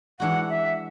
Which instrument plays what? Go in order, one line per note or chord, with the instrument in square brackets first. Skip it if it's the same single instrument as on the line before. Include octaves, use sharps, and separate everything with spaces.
[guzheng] E3 G#3 D4 F#4 [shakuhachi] F#5
[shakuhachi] E5